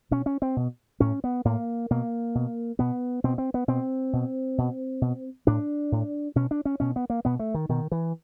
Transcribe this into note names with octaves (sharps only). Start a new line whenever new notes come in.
B2 C#4
C#4
C4
B2
A2 C#4
B3
A2 A#3
B2 A#3
B2
B2 B3
B2 C4
C4
B3
B2 C4
B2
B2
B2
A2 D4
A2
B2 C#4
D4
C#4
B2 C#4
B3
A#3
B2 B3
A3
D#3
B2 D#3
E3